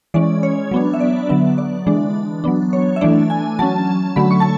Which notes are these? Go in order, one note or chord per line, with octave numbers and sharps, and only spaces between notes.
E3 G#3 C#4 D5
C#5
F#3 B3 D4
E5
D5
D3 F#3 B3 E5
D5
E3 G#3 D4
F#3 B3 D4
C#5
E5
E3 A3 D4 D5
G#5
F#3 C#4 A5
D3 F#3 A3 B5
C#6
A5